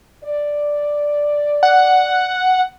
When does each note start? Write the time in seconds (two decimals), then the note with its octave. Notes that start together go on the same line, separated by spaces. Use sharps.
0.24 D5
1.63 F#5